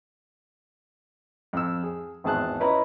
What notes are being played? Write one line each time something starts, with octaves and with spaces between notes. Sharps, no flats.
F2 E6
G#4
G#1 E2 G#4 A5 F#6
C#4 E4 B4 D#5 A#5